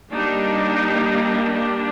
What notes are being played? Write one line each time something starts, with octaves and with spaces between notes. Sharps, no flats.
G3 A#3 D4 D#4
D4